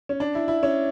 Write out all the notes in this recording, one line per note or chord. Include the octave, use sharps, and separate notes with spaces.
C#4
D4
E4
E4
C#4